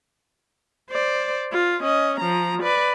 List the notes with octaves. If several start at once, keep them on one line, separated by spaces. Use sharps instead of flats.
C5 D5
F4
C#4 D#5
F3 A#5
B4 D5